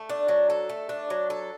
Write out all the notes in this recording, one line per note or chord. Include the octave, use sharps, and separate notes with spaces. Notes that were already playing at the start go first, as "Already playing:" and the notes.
Already playing: A3
D4
F#3
A4
A3
D4
F#3
A4